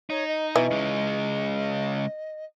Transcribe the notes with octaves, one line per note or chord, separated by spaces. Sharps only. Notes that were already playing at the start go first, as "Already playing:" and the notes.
D#4 C#5
D#5
B2 E3 D#4
C#3 G#3